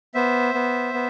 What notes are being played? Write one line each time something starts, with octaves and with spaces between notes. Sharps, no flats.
B3 C5 E5
B3
B3